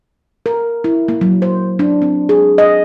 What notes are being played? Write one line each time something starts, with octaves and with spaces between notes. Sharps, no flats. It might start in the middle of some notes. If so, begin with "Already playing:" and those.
A#4
E4
A#3
F#3
C5
D4
C4
G#4
D#5